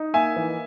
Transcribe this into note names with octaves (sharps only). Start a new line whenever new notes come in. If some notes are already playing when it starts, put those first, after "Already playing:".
Already playing: D#4
A#3 E5 G#5
E3